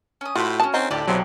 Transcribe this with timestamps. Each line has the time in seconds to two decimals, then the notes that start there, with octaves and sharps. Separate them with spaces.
0.21 C#4 D#6
0.35 A2 F4 F#4 C5 B5
0.60 B3 C#4 A5
0.74 D#3 F#3 C4 D#4
0.90 D2 A2 G4 D5 A5
1.07 B1 C3 E3 F#3 C5